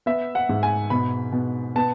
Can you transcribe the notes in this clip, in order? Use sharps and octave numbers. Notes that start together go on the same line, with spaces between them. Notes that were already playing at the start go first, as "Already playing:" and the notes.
B3 E5
F#5
G#2
G#5
B2 B5
B2
B3 A5